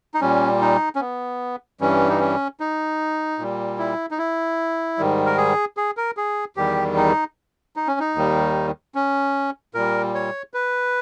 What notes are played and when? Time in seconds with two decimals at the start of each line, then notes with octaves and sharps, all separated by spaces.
0.14 D#4
0.21 A#2 G3 C#4
0.61 D#4
0.95 C#4
1.00 B3
1.80 G2 E3 G3 C#4
2.09 D#4
2.20 C#4
2.60 D#4
3.39 A#2 G3
3.78 E4
4.11 D#4
4.18 E4
4.98 G#2 D#3 G3
5.26 A#4
5.37 G#4
5.77 G#4
5.97 A#4
6.17 G#4
6.56 E2 D#3 G3 G4
6.96 D#4
7.76 D#4
7.88 C#4
8.00 D#4
8.15 D#2 D#3 G3
8.95 C#4
9.74 A#2 G3 A#4
10.15 C#5
10.54 B4